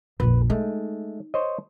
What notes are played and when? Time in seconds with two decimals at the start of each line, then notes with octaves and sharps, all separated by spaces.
0.20 A#1 F2 B4
0.50 G#3 A3 D#4
1.34 C5 C#5 D#5